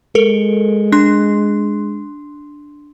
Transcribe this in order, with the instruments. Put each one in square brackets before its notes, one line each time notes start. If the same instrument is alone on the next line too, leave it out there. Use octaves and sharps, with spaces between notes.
[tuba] G#3 [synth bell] A4 A#4
[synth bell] D4 C6